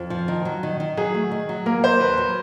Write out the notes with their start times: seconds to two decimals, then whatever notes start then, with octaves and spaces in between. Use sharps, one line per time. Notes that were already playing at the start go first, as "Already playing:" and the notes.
Already playing: F2
0.10 F3
0.28 D#3
0.45 F#3
0.63 D#3
0.80 D#3
0.97 F#3 G#4
1.14 A3
1.31 D#3
1.49 F#3
1.66 A#3 A#4
1.83 F#3 C5
2.01 D#2 B4
2.18 F#3